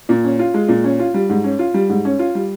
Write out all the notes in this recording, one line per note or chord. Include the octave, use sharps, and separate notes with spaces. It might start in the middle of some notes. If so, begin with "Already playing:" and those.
A#2
C#4
F4
G#3
A#2
C#4
F4
G3
G#2
C#4
F4
G3
G#2
C#4
F4
G3